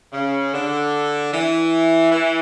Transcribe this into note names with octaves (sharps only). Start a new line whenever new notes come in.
C#3
D3
E3
E3